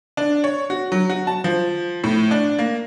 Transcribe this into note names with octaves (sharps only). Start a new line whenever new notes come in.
D4
C#5
F#4
F#3
F#4
A5
F3
A2
D4
A#3